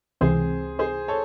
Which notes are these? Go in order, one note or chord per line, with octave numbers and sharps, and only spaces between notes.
C#2 C3 E3 C4 G#4 C5
G#4 C5
A4 C#5